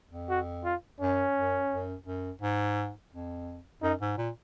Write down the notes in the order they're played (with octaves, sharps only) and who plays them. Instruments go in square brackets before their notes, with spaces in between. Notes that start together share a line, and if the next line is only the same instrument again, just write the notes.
[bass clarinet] F2
[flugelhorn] F#4
F4
[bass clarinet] F#2 [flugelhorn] C#4
[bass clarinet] F#2
F#2
F#2
G#2
F2
[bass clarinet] F#2 [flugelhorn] D#4
[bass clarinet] G#2
A#2